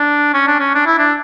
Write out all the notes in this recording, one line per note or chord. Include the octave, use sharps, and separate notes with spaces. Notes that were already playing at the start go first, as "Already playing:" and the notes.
Already playing: D4
C#4
D4
C#4
D4
E4
D4